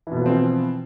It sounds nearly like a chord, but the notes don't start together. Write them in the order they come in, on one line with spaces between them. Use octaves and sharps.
E3 B2 B3 F3 C4